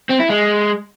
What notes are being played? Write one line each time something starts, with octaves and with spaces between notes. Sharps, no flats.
C4
E4
G#3